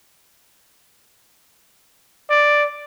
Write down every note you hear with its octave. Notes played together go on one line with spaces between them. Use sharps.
D5